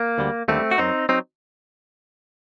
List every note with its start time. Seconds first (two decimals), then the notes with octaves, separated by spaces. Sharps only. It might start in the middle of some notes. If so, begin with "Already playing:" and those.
Already playing: A#3
0.18 D2 D3 G3
0.48 D#2 D3 G3 A3 C4
0.71 F#4
0.78 F#2 F#3 C4 D#4
1.09 F#3 C4 D#4